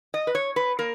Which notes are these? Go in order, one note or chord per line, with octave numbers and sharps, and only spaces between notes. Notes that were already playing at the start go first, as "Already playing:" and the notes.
D#5
B4
C#5
B4
A#3 A#4